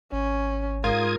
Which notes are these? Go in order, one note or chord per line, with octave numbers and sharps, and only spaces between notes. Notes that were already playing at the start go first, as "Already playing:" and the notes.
G#1 C#4
G#2 F4 A#4 D#6 G#6